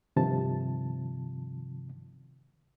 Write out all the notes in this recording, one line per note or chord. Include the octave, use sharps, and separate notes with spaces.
G2 C3 D#3 F3 A5